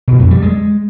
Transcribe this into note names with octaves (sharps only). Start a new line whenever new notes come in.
B2
F2
G3
G#3